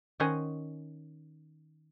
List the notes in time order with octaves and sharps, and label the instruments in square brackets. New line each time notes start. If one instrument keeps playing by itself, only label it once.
[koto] D#3 C#4 C5 D#5 F#5 G#5